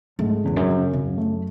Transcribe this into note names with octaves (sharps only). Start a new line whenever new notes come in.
G#2 A3
E2 C#3
F#2
C#3
F#2 C#3
A3